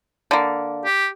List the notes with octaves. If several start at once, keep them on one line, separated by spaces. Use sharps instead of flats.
D3 A#3
G4